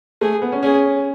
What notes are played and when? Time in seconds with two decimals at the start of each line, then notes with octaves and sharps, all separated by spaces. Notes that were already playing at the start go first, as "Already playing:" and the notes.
0.21 A3 G#4
0.42 B3
0.52 C#4
0.63 C#4 G#4